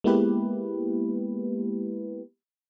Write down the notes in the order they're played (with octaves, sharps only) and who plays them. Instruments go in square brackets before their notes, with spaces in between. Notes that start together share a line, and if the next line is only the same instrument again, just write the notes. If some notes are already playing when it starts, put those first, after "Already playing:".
[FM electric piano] G#3 A#3 B3 E4 G4 B4